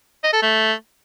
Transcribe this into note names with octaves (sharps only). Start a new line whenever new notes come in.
D#5
A4
A3